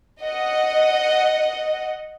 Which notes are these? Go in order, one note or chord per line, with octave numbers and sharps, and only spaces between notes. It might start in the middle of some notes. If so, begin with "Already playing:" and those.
D#5 F#5